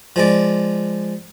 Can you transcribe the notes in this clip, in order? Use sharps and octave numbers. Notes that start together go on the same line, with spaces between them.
F3 G#3 D5